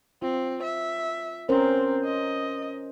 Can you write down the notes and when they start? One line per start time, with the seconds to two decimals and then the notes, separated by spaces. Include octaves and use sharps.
0.22 C4 F4
0.63 E5
1.49 C4 C#4 A#4 C5
2.04 D#5